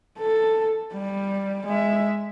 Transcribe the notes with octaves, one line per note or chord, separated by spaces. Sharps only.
A4
G3
G#3 E5